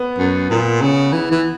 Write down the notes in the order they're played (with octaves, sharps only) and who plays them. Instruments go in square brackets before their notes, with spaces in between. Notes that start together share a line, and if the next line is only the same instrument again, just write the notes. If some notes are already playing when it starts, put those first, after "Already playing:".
Already playing: [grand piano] B3
[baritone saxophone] F#2
A#2
C#3
E3
E3